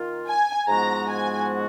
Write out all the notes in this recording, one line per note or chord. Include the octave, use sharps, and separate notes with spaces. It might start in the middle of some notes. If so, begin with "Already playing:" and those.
Already playing: D#3 A#3 F4
G#5
G#2 F3 G#3 B3 F#4 A#5
G#5